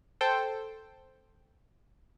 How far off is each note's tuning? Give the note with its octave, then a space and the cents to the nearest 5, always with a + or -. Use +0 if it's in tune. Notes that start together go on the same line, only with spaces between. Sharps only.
A4 +0 C5 +0 G5 +0